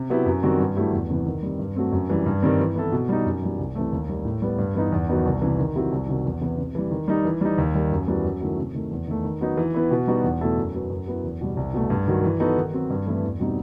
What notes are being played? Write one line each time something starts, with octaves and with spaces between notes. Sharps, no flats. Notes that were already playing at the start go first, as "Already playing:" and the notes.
Already playing: C3
F#3 B3 E4 G4
F#2
D#3 G3 C4 F#4
G2
F#3 A3 E4 G4
E2
C3 E3 B3
D#3
G3 C4
G2
F#3 A3 C4
F#2
E3 G3
G2
D#3 G3 C4
E3
B3 E4 A4
B2
G3 D#4
F#2
E3 G3
C2
C3 E3 A3
D#2
D#3 G3
A2
G3 B3
G2
E3 B3 D#4
E2
D#3 F#3 B3 D#4
C2
C3 E3
D#3
F#3 C4 E4 G4
C2
C3 D#3 F#3
E2
C3 E3 B3 E4
C3
E3 G3
D#3
G3 D#4
E3
G3 D#4
D#2
D#3 G3
F#2
E3 G3 B3 F#4
F#2
D#3 F#3 A3 E4
C3
D#3 A3
E2
D#3 A3
D#3
F#3 B3 D#4
E3
B3 E4
B2
G3 B3 D#4 F#4
E2
B2 A3 E4 A4
F#2
F#3 B3
F#2
F#3 B3 E4
E2
B2 G3
C2
B2 A3
G2
D#3 F#3
E3
B3 D#4 F#4 A4
D#3
F#3 C4
G2
E3 A3 C4 E4
E2
B2 G3 C4 D#4